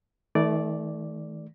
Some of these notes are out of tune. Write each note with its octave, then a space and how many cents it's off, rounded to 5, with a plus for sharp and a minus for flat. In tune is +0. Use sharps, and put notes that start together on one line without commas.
D#3 +45 A3 -20 D5 -5